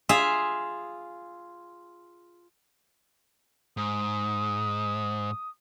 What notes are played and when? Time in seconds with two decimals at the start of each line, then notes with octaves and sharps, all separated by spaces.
0.09 F4 G#4 E5 F5
3.77 G#2 D#6